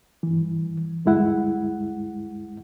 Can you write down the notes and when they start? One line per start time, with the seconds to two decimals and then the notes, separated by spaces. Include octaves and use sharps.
0.23 G2 E3
1.05 D2 G2 G#3 E4 F#5